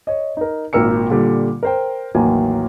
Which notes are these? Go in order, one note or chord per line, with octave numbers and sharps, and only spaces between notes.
C#5 D#5
D#4 A#4
G#1 A#2 A#4 E6 C#7
A#2 D3 G3
A#4 C5 G5
A1 D#2 F#3 A#3 G#5